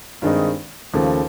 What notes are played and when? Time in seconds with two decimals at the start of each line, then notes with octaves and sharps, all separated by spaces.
0.22 G2 D#3 G#3 C4 D#4
0.93 D#2 C#3 F3 A3